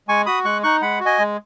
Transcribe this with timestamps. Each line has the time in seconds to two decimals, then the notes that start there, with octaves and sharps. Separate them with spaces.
0.08 G#3 G#5 C#6
0.26 F#4 B5 D#6
0.44 G#3 C#6 F#6
0.63 D#4 C#6 F#6
0.82 G#3 F#5 B5
1.00 F#4
1.06 D#5 G#5
1.19 G#3